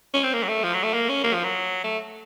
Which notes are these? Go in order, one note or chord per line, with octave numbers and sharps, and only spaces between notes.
C#4
C4
A#3
F#3
A3
F3
F#3
A3
A#3
C#4
A#3
F3
F#3
A3